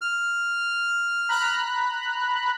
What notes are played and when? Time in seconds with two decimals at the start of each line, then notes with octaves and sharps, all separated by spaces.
0.01 F6
1.29 A#5 B5 F#6